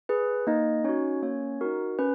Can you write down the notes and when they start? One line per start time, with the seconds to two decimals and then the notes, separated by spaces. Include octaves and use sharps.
0.09 G#4 B4
0.47 A#3 D#4 D#5
0.84 C#4 D#4 F#4 C#5
1.22 A#3 C#4 C#5
1.61 D#4 F#4 A#4
1.99 C#4 B4